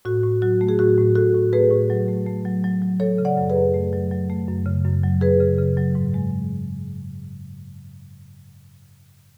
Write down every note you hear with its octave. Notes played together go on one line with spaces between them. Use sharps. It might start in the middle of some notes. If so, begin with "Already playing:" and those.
A2 F#4
A2
F#3 F#4
A3
G#4
A2 F#4
A2
A2 F#4 A4
A2
A3 G#4 B4
A2
F#3
A3
A3
F#3
F#3
F#3
F#3 A4 C#5
C#3
D5 F#5
F#2
G#4 B4
F#2
A3
F#3
F#3
A3
F#2
C#3
F#2
F#3
F#2 G#4 B4
C#3
C#3
F#3
G#2
G#3